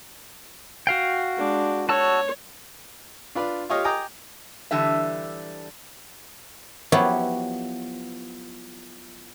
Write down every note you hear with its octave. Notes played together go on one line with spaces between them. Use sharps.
F#4 F5 G5
G#3 D4
F#4 C#5 A5 E6
D4 F4 B4 D5
F4 G4 C#5 D#5 F5
D#5 G5 G#5 A#5 D6 D#6
D3 E3 G3 D4 E5
F3 F#3 B3 E4 G4 C#5